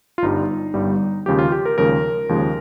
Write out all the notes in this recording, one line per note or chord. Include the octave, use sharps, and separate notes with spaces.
F4
G1 G2 G3 D#4
G1 G2 G3
D#2 C#3 F3 G#3 G4
F4
G4
A#4
D#2 C#3 F3 G#3 A#4
D#2 C#3 F3 G#3